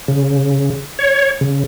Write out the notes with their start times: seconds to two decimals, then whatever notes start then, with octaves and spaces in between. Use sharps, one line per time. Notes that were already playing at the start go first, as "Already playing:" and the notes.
0.08 C#3
0.99 C#5
1.41 C#3